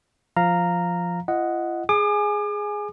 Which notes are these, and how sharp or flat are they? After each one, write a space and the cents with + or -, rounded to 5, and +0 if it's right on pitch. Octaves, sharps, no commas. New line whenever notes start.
F3 +0 F5 +0 A#5 -10
F4 -45 D#5 +0 F#5 +0
G#4 +0 G#5 +5 D6 +40